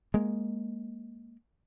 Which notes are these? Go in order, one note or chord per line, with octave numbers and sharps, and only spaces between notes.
G#3 A#3